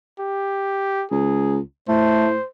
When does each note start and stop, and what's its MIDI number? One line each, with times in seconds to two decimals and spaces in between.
0.20 1.05 67
1.12 1.59 37
1.12 1.59 68
1.88 2.34 45
1.88 2.29 57
1.88 2.47 72